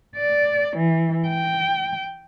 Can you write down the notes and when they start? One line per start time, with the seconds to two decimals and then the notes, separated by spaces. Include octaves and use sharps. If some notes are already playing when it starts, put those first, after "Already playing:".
0.16 D5
0.77 E3
1.28 G5